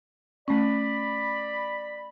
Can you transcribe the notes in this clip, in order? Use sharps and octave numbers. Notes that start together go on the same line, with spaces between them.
A3 C#4 D5 B5